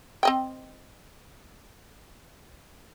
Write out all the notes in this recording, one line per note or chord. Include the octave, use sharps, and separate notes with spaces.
C4 D#5 G5